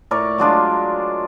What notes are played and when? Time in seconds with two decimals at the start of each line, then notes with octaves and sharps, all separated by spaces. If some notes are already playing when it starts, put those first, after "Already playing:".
0.11 A2 A#4 D5 C#6
0.38 F#3 G#3 D4 F4